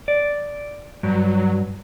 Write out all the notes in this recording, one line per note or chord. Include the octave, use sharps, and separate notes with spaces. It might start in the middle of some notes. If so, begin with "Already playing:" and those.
D5
G2 F#3